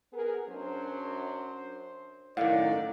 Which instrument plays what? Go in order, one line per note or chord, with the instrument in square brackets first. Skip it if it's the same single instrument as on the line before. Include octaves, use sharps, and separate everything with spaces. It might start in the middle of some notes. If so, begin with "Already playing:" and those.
[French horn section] B3 G#4 A#4
[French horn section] F#2 F#3 D4 [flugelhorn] C5
[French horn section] F#2 [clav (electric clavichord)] A2 D#3 [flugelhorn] D5 [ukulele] F5 F#5